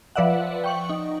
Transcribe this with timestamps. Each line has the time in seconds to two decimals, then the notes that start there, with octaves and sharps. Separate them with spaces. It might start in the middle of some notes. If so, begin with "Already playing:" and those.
0.16 F3 B4 D5 E5 F#5
0.64 G5 C#6 F#7
0.89 D#4